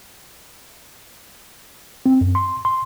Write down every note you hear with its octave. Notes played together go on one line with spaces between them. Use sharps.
C4
F#2
C6
C6